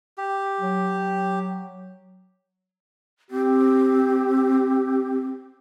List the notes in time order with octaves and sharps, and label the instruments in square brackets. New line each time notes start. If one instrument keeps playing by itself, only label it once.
[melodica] G4
[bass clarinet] F#3
[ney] C4 [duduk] G4